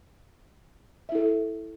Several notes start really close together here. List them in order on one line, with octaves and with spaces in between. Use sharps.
E5 E4 A4